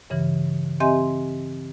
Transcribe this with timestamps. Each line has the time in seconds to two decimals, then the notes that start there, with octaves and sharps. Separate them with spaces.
0.10 G2 C#3 E3
0.80 C4 G4 D#5 E5 G#5 C6